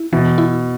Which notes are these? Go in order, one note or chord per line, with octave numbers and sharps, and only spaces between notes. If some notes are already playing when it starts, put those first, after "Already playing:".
Already playing: E4
B2 E3
E4